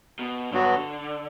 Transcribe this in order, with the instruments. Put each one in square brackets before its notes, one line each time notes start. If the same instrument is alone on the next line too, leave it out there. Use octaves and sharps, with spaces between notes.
[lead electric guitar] B2
[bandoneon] G2 F#3 B3 F#4 [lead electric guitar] D3